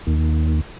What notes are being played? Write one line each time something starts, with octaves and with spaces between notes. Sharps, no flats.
D#2